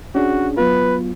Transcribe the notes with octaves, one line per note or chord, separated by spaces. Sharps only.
C#4 D4 F#4 G#4
F#3 B3 F4 B4